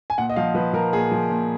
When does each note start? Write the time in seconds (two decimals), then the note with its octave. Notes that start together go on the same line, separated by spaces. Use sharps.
0.10 G#5
0.18 A#2 F#5
0.30 D#5
0.36 F3 F5
0.55 F3 B4
0.73 F3 A#4
0.93 A#2 G#4
1.12 F3
1.30 A#2